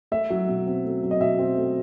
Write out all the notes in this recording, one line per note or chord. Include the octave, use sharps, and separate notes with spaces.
A3 E5
F#3
B2
C4
A3
F#3
D#5
B2 E5
C4
A3